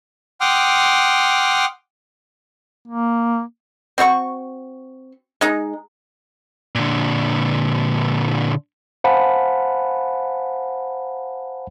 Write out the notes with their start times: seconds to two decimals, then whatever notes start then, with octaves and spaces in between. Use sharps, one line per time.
0.41 F#5 G5 C6 D6 D#6 F6
2.88 A#3
3.98 C4 F#4 F#5 C#6
5.41 G#3 D#4
6.75 A#2 D3
9.04 C5 F5 F#5 G#5 A5 B5